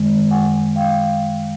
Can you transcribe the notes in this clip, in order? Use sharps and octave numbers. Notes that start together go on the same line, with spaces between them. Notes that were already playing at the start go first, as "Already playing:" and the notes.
Already playing: F#2 D#3 G#3
F#5 G#5
F5 G5